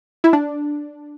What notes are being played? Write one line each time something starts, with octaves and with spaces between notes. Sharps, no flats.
E4
D4